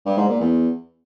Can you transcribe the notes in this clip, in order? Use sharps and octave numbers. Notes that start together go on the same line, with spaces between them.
G2
G#2
A#2
E2